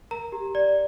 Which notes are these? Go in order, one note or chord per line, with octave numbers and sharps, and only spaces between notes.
A#4 A#5
G4
D5